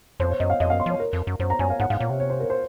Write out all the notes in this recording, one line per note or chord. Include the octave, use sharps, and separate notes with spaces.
F2 C5
C#5
F#2 D#5
F5
F2 D#5
F#2 F5
C6
F3 C#5
A#4
F2
F#2
F#2 C5
A#5
F#2 G#5
F5
G#2 F#5
G#2 F5
A#2 C#5
C3
C#5
C5
A#4
C5